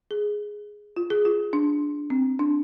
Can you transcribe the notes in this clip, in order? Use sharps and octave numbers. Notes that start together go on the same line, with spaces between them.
G#4
F4
G#4
F4
D4
C4
D4